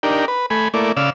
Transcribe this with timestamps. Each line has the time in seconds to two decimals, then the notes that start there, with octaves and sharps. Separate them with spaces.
0.03 D4 D#4 G4 A#4
0.28 B4
0.50 A3 G#5 B5
0.74 A3 A#3 E4 D5
0.97 C#3 D5 F5 E6